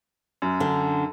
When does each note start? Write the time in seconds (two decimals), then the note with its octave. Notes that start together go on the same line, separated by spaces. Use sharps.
0.42 F#2
0.60 D3